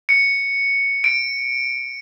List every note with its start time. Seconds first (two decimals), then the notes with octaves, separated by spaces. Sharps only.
0.09 C#7
1.04 D7